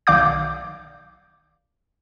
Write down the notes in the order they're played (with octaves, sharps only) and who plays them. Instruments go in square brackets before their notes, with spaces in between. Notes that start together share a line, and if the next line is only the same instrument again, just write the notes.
[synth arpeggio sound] B1 D#3 D5 F5 D6 G6